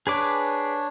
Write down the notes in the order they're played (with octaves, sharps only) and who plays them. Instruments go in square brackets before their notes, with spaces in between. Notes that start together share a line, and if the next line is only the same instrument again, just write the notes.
[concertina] D4 C#5 [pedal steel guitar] G#4 B4 D6